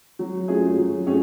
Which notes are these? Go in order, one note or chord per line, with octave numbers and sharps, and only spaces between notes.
F#3
A3 C#4 F4 G#4
F#3
A3 C#4 F4 G#4